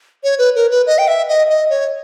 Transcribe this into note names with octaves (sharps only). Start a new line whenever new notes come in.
C#5
B4
A#4
B4
D#5
G5
E5
D#5
D#5
C#5